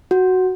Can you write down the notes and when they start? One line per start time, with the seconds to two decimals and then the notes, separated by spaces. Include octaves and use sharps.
0.11 F#4